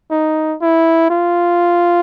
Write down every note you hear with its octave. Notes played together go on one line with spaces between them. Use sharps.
D#4
E4
F4